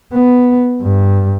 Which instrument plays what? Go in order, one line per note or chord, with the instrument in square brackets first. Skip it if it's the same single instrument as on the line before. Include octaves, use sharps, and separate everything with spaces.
[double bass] B3
G2